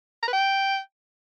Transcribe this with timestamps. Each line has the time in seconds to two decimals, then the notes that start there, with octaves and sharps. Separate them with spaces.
0.23 A#5
0.28 B4
0.33 G5